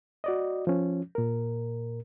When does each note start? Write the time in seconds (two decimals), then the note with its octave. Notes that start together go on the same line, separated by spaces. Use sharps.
0.24 F#4 D5 D#5
0.67 F3 C#4
1.15 A#2 A#4